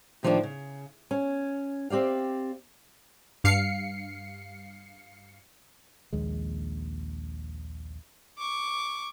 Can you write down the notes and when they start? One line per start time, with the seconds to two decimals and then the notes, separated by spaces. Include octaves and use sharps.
0.23 A2 D#3 F3 G3 A#3 D4
0.43 C#3
1.11 C#4
1.90 C4 G4 D5 F5
3.44 G2 F5 C7 C#7
6.13 A#1 D#2 G#3
8.38 C#6 D6